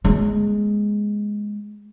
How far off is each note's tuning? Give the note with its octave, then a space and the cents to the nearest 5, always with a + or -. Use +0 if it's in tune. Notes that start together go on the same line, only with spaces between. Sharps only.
G#3 +0 B3 -45